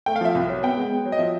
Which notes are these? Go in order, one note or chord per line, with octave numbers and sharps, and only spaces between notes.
A3 G5
F5
F3 E5
C2
F#3
B3 G5
G#3
B3
F#3
D#5
F3 E5